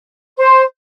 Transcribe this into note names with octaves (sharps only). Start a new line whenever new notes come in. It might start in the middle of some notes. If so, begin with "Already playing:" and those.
C5